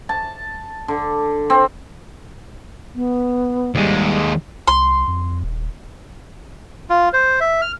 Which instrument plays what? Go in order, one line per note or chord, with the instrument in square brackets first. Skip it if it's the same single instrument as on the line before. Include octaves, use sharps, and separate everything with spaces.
[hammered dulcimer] A5
D3
C4
[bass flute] B3
[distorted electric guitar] D#2 G#3 [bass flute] G3
[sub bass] C2 [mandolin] C6
[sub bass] F2
D#1
[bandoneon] F4
C5
E5
F6